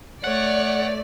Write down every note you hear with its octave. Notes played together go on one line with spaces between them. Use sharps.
A3 C#5 D5 F#5